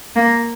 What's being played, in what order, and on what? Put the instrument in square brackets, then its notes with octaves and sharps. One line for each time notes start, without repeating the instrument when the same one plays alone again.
[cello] A#3